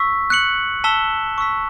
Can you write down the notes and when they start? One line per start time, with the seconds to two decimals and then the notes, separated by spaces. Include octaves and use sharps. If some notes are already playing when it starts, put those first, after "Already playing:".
Already playing: C#6 E6 B6
0.30 F#6 C#7 F#7
0.84 A5 E6 B6 E7 G7
1.38 C#6 E6 B6